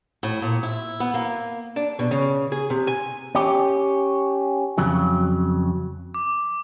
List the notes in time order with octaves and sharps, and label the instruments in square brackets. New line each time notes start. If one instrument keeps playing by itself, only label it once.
[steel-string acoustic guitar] A2
A#2
E4
B3
A#3
[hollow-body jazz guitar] D4
B2
C#3
G#4
C3
G#5
[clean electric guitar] C#4 G4
F2 C#3 F#3
[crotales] D6